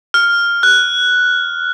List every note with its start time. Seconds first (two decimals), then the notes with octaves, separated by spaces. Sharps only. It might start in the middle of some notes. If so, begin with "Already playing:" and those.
0.14 F6
0.63 F#6